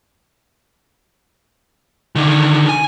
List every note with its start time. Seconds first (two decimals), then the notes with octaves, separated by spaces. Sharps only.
2.16 D3 D#3
2.69 G#5